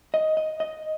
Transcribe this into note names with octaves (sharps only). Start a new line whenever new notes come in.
D#5
D#5
D#5